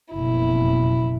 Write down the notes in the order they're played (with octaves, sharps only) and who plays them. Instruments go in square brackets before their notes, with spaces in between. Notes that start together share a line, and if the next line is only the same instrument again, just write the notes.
[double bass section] F#1 F2 B2 [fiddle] E4